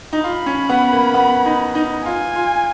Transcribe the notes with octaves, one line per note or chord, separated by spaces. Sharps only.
D#4
F4 B5
C#4
B3
A#3
B3
D#4
D#4
F4 G#5
F4